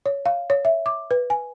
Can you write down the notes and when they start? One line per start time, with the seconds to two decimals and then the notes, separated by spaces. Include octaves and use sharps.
0.06 C#5
0.26 F5
0.50 C#5
0.65 E5
0.86 D6
1.11 B4
1.30 G#5